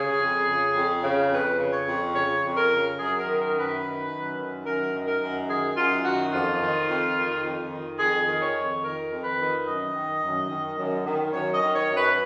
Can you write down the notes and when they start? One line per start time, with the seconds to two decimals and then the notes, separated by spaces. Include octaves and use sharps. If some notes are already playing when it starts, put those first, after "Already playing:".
Already playing: C#3 G#4
0.20 F2
0.47 C#3
0.75 F2
1.02 C#3
1.31 F2 B4
1.59 C#3
1.72 C#5
1.86 F2
2.13 C#3 C#5
2.42 F2
2.56 A#4
2.69 C#3
2.98 F#2 G#4
3.18 A#4
3.26 D#3
3.39 A#4
3.53 F#2
3.60 B4
3.82 D#3
4.10 F#2
4.37 D#3
4.65 F#2 A#4
4.93 D#3
5.06 A#4
5.20 F#2
5.48 D#3 G#4
5.76 F#2 F4
6.04 D#3 F#4
6.32 F2 F4
6.60 D#3
6.88 F2
7.16 D#3
7.43 F2
7.70 D#3
7.98 F2 G#4
8.27 D#3
8.41 C#5
8.54 F2
8.83 D#3 A#4
9.11 F2
9.24 B4
9.39 D#3
9.66 F#2 D#5
9.94 D#3
10.22 F#2
10.49 D#3
10.78 F#2
11.05 D#3
11.32 F#2 C#5
11.54 D#5
11.62 D#3
11.75 C#5
11.89 F#2
11.96 B4